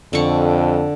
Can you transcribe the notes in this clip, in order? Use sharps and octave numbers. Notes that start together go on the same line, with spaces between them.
F2 D3 C#6